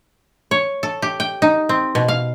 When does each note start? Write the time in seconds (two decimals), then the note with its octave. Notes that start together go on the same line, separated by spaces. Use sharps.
0.51 C#5
0.83 A4
1.02 G4
1.20 G5
1.42 D#4
1.69 C4
1.95 B2
2.08 F5